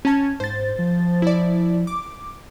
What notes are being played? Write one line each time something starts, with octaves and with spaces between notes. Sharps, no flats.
C#4 A5 G#6
G#2 C5 A6
F3
E4 D5
D6